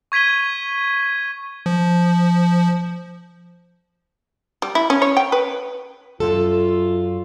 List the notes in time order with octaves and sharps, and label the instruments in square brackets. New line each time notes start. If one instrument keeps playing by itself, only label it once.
[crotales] C#6 G#6 B6 D#7 G7
[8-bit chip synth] F3
[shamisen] G3
E4
C#4
C#5
G5
B4
[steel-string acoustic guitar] F#2 A4 [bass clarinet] F4